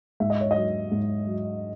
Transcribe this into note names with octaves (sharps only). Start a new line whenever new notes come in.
G#2 E5
D#5
C#5
F#3 D#5
G#2
F#3